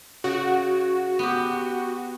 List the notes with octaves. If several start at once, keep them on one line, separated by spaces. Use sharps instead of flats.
C#3 F#4
B3 G4